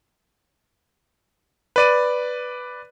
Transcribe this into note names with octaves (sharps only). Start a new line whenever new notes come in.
B4 D5 D#7